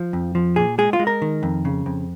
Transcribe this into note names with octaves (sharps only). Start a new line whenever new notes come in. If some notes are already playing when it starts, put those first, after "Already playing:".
Already playing: F3
F2
F3
A#2 G#4
G#3 G#4
F4
G#3
A#4
D#3
F2
C#3
F2